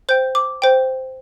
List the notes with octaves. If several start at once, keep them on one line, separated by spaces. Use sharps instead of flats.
C5 G5 G6
D6
C5 G5